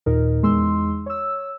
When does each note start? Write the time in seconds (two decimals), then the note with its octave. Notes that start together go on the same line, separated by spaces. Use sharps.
0.06 D#2 A#2 D#4 A#4
0.43 E2 G#3 D#4 C6 E6
1.06 C#5 E6